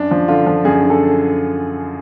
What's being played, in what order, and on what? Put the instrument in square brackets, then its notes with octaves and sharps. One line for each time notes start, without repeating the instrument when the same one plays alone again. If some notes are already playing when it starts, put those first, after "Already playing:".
Already playing: [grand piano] F#2 D4
F3
D3 F4
F3
F#2 G#4
D3
A4